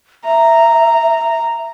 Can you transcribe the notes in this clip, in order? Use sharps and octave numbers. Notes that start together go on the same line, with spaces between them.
E5 A#5